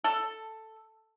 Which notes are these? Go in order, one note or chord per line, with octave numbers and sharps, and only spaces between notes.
A4